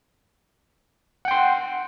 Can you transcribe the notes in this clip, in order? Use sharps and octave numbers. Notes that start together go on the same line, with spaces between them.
F#5 G5 C6